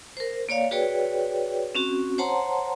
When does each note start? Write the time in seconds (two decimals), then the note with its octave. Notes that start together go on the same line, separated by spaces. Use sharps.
0.17 A#4 C5
0.49 A#3 C#5 D5 F5
0.71 F#4 G#4 B4 C#5 D5 G5
1.75 C4 C#4 F#4
2.18 C5 C#5 F#5 A5 A#5 C6